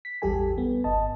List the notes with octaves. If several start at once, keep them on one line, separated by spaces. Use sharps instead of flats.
B6
A1 E2 G3 G4 A4 G#5
B3
G1 D#5 A5